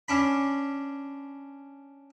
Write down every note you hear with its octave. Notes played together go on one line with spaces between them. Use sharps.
C#4 D4 B5